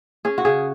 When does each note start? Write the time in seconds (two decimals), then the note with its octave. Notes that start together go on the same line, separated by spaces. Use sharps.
0.25 C#4 G#4
0.38 F#4
0.45 C#3 G#4